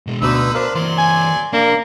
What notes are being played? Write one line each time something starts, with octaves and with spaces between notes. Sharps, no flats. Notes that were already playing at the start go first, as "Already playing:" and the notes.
B2 G#3
D2 B2 D3 D#4 B4 E6
D4 A#4 C5 F5
E3 F#3 A#3 D5 C6
G#5
A#3 D4 A#4 D5